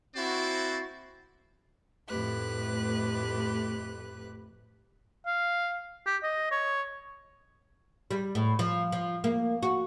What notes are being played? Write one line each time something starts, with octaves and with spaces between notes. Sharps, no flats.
A#3 C4 E4 F#4 C5 D5
F2 A2 A3 G4 B4 F#6
F5
G4
D#5
C#5
G3
A2
F3
F3
A#3
F#4